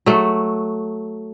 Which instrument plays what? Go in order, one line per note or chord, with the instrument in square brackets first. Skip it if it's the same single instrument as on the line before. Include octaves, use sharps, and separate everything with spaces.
[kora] F#3 A3